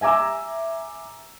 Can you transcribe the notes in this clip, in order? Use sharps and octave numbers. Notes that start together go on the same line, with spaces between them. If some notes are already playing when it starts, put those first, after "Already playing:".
E5 G#5 A#5 D6 E6